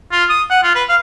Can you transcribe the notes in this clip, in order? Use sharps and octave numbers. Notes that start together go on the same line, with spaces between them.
F4
D#6
F#5
F4
B4
F5